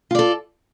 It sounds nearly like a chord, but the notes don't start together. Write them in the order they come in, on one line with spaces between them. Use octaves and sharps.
F4 D5 A4